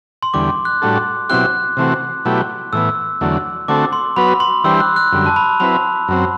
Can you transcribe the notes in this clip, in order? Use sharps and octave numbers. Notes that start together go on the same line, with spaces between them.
C6
E2 D3 G3 D6
F#6
A2 G3 D4 F#4 A4
B2 F#3 C4 E4 G4 F#6
C3 E3 A3 C4 F#4
B2 F#3 A3 E4 G4
A2 E3 B3 E6
E2 D3 F#3 A3
D3 A3 C4 F#4 A4 D6
C6
F#3 B3 F#4 B4 B5
B5
C6
E3 G3 D4 G4 C5 E6
F#6
F#6
F#2 D3 G3
A5
B5
F#3 C4 E4 B4 B5
F#2 F#3 C4